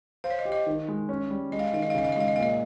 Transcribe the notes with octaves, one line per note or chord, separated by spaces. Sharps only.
C5 F5
C#5
D#5
G4
D#5
D#3
G#3
C#4
G3
G#3 D#5
F5
D#5
D#3 F5
D#5
F5
C#3 D#5
F5
D#5
G#3 F5
D#5
A#2 F5
D#5